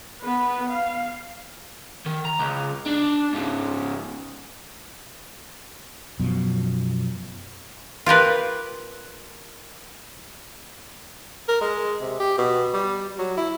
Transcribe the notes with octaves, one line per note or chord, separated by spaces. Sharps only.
B3 B4
F5
D#3
A#5
C#2
D4
G#2 C#3
F#2 B2 F3
F4 G4 A#4 B4
A#4
G#3
C3
G4
B2
G3
F#3
E4